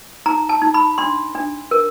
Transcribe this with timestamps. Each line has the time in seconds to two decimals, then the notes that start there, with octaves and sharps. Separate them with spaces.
0.26 D#4 A#5
0.49 A5
0.62 D#4
0.74 B5
0.98 D4 C6
1.35 D4
1.71 A#4